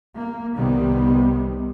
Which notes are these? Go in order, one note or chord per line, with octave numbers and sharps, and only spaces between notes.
A#3
C2 C3 D#3 G3 B3